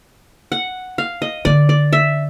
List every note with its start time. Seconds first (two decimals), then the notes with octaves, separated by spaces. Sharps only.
0.52 F#5
0.98 F5
1.22 D#5
1.45 D3 D5
1.69 D5
1.93 E5